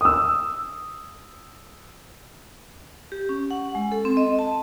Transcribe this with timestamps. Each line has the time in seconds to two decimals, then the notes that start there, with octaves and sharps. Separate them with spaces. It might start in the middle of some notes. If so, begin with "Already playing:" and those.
0.01 D#6 E6
3.12 G4
3.29 C#4
3.51 F#5
3.75 G#3
3.92 A4
4.05 C4
4.17 D#5
4.39 A5